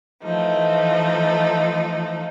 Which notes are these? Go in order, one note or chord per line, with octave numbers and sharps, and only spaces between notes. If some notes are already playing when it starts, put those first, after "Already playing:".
E3 F3 A3 D#4